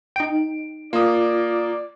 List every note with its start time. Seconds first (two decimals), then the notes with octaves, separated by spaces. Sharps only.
0.16 D#4 G5 D7
0.93 A#3 F4 D5 D#6